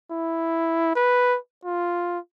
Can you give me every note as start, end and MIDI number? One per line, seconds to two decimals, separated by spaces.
0.11 0.95 64
0.96 1.38 71
1.65 2.19 65